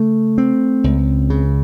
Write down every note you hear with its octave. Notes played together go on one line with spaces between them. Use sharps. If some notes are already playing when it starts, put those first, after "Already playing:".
Already playing: C#3 A3
C4
C#2
C#3